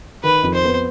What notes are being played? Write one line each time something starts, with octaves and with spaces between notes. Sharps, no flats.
D#3 B4
F2
C5
B3